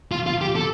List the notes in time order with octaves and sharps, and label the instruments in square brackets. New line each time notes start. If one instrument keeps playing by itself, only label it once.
[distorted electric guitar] F4
F4
G4
A4